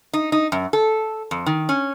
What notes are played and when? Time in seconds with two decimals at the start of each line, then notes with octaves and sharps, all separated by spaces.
0.13 D#4
0.32 D#4
0.52 F#2
0.73 A4
1.31 F2
1.46 D#3
1.69 C#4